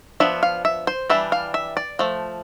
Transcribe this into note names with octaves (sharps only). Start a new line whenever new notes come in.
F3 B3 D4 E5
F5
E5
C5
E3 G3 D4 E5
F5
E5
D5
F3 A3